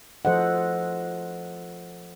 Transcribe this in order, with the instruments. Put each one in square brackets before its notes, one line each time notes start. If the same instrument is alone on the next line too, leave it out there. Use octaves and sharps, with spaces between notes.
[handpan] F3 A4 C5 D#5 F#5